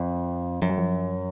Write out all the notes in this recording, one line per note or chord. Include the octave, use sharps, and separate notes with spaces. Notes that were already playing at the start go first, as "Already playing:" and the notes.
Already playing: F2
F#2 F3
F#3
F3